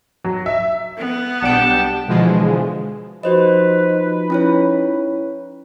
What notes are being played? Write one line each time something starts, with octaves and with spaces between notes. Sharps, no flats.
F#3
E5
B3
B1 G3 D4 F#5 G5 A5
B2 D3 E3 F3 G#3
F3 D#4 F#4 B4 C5 D#5
C#4 E4 C#5